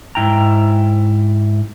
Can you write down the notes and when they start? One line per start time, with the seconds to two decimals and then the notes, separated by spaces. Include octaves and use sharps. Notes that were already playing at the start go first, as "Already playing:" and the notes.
0.15 G#2 C3 E4 G5 A#5